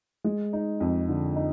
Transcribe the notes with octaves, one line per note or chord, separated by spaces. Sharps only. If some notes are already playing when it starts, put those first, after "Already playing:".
G#3
D#4
F2
D3
D#4